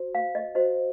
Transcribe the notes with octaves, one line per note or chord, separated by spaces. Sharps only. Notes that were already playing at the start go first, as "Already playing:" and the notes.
Already playing: F#4 C5
F5
D#5
F#4 C5 D#5